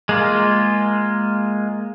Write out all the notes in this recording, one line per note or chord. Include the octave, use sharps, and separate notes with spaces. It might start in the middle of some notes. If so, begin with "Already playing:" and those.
G#3 A#3 F4